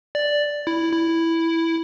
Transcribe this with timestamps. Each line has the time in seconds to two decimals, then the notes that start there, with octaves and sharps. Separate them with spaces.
0.15 D5
0.67 E4
0.93 E4